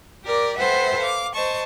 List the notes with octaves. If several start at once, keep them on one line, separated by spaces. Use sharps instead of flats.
G4 A#4 D5
A4 B4 C5 E5 F#5 G5
F5 D6
C5 D#5 A5 C#6